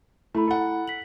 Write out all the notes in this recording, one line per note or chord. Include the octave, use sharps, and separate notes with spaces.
A3 E4 A#5 B5
A4 F#5
B6 F#7